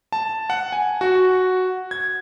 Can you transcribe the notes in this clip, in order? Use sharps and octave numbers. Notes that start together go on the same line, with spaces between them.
A5
F#5
G#5
F#4
G#6